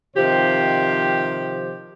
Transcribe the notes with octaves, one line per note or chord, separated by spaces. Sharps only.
C3 D#3 F3 G4 C5